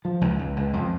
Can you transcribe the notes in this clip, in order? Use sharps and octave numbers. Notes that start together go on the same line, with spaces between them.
F3
C#2
C#2
C#2
F2